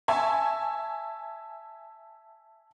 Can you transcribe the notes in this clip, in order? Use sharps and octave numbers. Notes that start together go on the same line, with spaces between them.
E5 G#5 A5 C#6 G#6